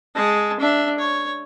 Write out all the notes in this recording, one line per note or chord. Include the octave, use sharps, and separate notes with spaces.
G#3 A5
D4 E5
C#5